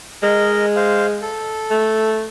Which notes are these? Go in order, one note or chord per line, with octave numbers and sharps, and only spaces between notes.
G#3 A#4 D#5
C5 F5
A4
A3